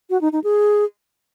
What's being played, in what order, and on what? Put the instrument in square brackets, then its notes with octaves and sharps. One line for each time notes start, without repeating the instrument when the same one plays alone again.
[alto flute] F#4
D#4
D#4
G#4